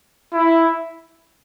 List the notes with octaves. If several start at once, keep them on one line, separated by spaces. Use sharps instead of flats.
E4